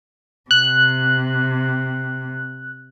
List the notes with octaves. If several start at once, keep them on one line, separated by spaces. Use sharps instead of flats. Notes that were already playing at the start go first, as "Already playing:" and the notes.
C3 F#6